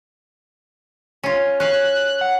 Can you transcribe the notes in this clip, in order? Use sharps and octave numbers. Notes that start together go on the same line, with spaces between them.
C#4 F4
C#4 F5 F#6
F#5